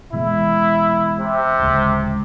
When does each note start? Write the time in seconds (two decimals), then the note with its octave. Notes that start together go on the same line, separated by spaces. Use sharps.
0.13 B2 E3 G#3 E4
1.18 C3
1.59 D1 C#3 G#3